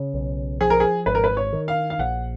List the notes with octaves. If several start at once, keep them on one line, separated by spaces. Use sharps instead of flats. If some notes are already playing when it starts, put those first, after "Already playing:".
Already playing: C#3
B1
F3 G#4
A#4
G#4
G#1 B4
A#4
B4
C#5
D#3
F5
F5
A#1 F#5